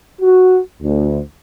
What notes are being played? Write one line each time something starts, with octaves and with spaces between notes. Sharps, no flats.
F#4
D2